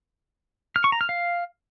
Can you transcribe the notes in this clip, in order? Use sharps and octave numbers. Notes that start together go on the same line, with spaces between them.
F6
C#6
A#5
F6
F5